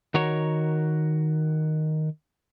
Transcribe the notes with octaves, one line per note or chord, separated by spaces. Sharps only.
D#3 F#4 A#4 C#5